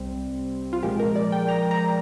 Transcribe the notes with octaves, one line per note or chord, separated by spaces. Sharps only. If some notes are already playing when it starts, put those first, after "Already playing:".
Already playing: C2 C3 G3 C4
F4
A#2 F3 G#3 G4
A#4
D5
G5
A#5
A#5